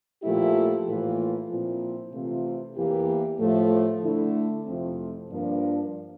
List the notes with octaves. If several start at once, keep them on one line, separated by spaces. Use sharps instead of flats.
A#2 F3 A3 E4 G4
A2 E3 A#3 F4
A#2 F3 C4 E4
C3 E3 A3 C4 F4
E2 E3 A#3 E4 G4
A2 F3 A3
D3 A3 E4
F2 C3 F3 A3 C4
G2 F3 A#3 D4